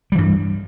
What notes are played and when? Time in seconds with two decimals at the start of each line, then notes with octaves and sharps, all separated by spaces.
0.12 G3
0.15 E3
0.18 G2